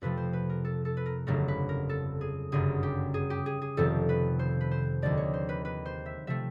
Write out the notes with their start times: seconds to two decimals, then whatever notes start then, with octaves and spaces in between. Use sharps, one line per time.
0.02 F2 C3 F3 A3 B4
0.17 C5
0.33 B4
0.50 A#4
0.65 A4
0.85 A4
0.97 B4
1.06 A#4
1.27 G1 F2 C#3 F#3 A3 A#4
1.48 B4
1.69 A#4
1.89 A4
2.21 G#4
2.52 G1 F#2 C#3 G#4
2.83 G4
3.14 G#4
3.30 G4
3.46 G#4
3.62 G#4
3.77 F1 F2 C3 D#3 A4
4.09 B4
4.39 C5
4.61 B4
4.71 C5
5.02 D#2 D3 F3 G#3 D5
5.17 C#5
5.34 C5
5.49 B4
5.65 B4
5.86 C5
6.06 E5
6.27 C3 F3 A3 E5